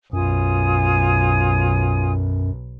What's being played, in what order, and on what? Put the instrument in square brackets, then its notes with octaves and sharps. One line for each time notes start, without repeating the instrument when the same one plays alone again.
[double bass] B1 [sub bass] F#2 [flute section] F4 G#5 D#6